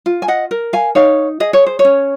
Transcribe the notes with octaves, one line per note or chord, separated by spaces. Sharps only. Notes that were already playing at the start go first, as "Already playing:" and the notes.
F4
G#5
D#5 F#5
A#4
F5 G#5
D#4 C#5 F5
G#4 D#5
C#5
C5
C#5
C#4